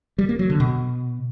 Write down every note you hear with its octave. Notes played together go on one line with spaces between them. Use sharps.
G3
A#3
F#3
D3
B2